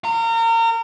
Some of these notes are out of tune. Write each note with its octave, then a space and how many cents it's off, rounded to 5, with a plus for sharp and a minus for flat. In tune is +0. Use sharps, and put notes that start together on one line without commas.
A#4 -30